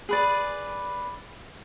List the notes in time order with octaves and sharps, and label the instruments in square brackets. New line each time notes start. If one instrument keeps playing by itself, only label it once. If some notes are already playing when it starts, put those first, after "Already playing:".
[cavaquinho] G#4 B4 D5